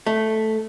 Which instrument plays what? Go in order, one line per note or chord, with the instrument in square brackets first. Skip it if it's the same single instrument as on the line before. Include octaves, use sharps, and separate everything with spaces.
[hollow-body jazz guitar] A3